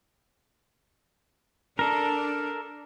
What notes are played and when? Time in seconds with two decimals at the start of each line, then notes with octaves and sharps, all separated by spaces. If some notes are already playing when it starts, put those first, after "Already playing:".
1.79 D4 A4 A#4